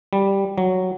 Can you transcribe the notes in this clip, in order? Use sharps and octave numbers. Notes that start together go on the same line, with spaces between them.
G3
F#3